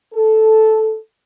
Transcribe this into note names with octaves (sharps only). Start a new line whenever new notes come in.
A4